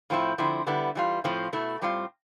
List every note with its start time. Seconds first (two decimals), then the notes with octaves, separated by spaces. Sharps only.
0.10 A2 F3 C4 E4
0.38 D3 F3 C4 E4
0.67 D3 G3 B3 E4
0.95 E3 G3 D4 F4
1.24 A2 F3 C4 F4
1.53 B2 A3 E4
1.82 A2 G3 C4 F4